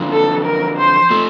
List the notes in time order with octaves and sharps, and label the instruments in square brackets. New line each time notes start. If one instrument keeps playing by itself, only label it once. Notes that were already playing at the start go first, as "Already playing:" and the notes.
Already playing: [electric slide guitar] D3 F3
[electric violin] A4
A#4
C5
[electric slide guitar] F3 A3